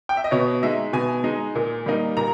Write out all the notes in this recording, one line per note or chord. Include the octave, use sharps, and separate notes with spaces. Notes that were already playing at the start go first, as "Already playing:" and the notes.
G5
E5
D#5
B2 C#5
G#3 D#4 E5
B2 G#5
G#3 D#4
A#2
G3 A#3 D#4
A#2 A#5